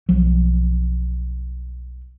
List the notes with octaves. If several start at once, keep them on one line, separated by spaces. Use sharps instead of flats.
B1 F3 F#3